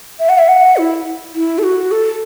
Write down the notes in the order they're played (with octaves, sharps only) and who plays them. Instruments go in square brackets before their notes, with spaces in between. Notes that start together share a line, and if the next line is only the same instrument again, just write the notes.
[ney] E5
F#5
E5
F#5
E4
E4
A4
F#4
A4